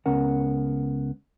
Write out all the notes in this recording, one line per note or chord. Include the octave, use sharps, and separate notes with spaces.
C#2 B3 C#4 A#4 F#5